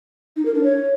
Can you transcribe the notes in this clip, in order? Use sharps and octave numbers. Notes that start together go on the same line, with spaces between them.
D#4
A#4
D4
C#5